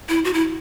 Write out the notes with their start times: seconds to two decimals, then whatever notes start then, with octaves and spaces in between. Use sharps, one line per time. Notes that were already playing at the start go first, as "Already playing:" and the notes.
0.09 E4
0.25 F#4
0.34 E4